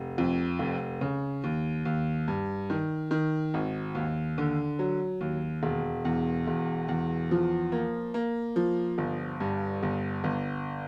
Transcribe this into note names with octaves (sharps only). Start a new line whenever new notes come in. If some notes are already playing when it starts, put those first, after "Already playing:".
Already playing: F1
F2
F1
C#3
D#2
D#2
G2
D#3
D#3
G#1
D#2
D3
F#3
D#2
E1
E2
E1
E2
F3
A#3
A#3
F3
G1
G2
G1
G1